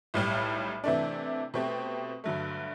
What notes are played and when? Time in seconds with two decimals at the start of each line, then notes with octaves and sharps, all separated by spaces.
0.14 B1 A2 G3
0.84 C3 E3 A3 D4
1.54 B2 A3 C4 G4
2.24 G2 D3 F#3 A3